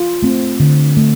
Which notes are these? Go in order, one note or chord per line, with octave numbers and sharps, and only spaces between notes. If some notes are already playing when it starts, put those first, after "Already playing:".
Already playing: F4
A3 C4
D3
A3